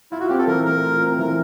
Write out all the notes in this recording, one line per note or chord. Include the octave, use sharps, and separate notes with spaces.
E4 F4
F#4
C4 G4
A4
E3 A#4
A3 A#4
F4
C4
E3 A#4